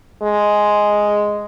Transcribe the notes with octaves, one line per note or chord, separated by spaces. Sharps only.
G#3